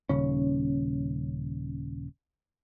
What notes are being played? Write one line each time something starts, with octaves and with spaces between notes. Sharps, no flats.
D#1 C#3 C#4